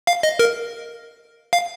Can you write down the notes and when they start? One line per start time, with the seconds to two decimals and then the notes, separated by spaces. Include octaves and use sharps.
0.07 F5
0.23 D#5
0.39 A#4
1.53 F5